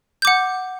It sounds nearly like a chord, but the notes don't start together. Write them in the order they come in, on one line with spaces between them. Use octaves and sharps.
G6 D6 F#5